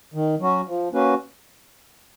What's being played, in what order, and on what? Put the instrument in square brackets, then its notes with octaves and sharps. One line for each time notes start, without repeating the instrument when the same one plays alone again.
[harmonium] D#3
F#3 C#4 F#4
F3
A#3 C#4 F#4 B4